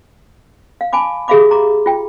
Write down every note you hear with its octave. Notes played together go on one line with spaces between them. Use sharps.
F5
G#5 A5 B5 D6
G4 G#4 E5 F5 B5 D6
A#5 C6 D6
F4 G5